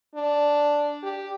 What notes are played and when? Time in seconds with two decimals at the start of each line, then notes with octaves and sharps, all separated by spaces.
0.15 D4
1.03 G4